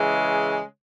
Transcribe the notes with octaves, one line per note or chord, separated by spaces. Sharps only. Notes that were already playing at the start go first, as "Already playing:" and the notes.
Already playing: C#3 E3 G#3